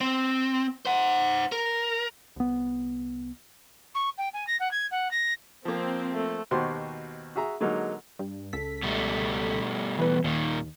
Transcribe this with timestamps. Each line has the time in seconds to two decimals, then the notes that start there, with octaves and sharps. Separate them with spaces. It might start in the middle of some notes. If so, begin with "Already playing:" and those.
0.01 C4
0.85 C5 F#5
1.52 A#4
2.36 C2 B3
3.94 C#6
4.18 G5
4.33 G#5
4.47 A#6
4.59 F#5
4.71 G#6
4.91 F#5
5.11 A#6
5.65 F3 A#3 C4
6.13 A3
6.51 D#2 B2 F#4 G4 C5 C6
7.36 F#4 G#4 E5 A#5
7.60 D3 F#3 G#3 A#3 D#4
8.19 G2
8.53 C#2 A4 B6
8.83 B2 G3 A3
9.98 E3 B3 B4
10.24 D#2 A#2 D#3